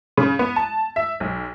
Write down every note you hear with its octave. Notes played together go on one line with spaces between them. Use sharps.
C#3
B3
A5
E5
B1